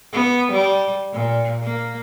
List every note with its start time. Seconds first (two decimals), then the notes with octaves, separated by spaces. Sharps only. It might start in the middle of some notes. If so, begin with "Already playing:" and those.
0.12 B3
0.52 G3
1.13 A#2
1.62 A#3